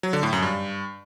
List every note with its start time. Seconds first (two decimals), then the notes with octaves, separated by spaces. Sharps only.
0.03 F#3
0.13 D3
0.23 A2
0.33 F#2
0.42 G2